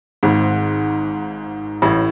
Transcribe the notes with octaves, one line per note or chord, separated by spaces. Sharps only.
G#1 G#2
A1 A2